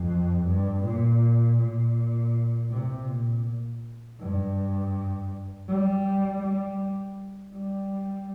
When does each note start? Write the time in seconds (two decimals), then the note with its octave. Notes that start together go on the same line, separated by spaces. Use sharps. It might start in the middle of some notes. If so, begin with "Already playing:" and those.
Already playing: F2
0.46 G2
0.84 A#2
1.59 A#2
2.70 C3
3.07 A#2
4.19 G2
5.68 G3
6.43 G3
7.54 G3